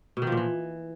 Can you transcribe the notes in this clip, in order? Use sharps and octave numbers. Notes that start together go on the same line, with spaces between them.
B2
D#3
F3
A#2
E3